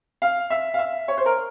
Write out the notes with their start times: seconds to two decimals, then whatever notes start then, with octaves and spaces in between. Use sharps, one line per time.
0.22 F5
0.50 E5
0.74 F5
0.79 E5
1.08 C#5
1.17 C5
1.26 A#4